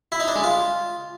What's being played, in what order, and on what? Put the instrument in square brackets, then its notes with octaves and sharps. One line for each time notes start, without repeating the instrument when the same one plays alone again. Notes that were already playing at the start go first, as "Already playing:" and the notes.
[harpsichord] E4
D#4
D4
G#3
F4